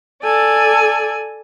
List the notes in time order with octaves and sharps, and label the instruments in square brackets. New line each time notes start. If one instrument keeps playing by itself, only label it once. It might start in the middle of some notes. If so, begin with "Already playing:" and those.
[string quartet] A4 D5 G#5